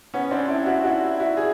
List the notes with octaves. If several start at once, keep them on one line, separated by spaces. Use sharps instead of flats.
B3 C#4
C4 D4
D4 E4
E4 F#4
E4 F#4
E4 F#4
G#4